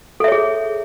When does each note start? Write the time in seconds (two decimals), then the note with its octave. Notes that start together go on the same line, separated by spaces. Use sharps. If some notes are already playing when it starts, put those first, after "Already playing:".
0.20 A4
0.24 E5
0.28 C#5
0.32 G#4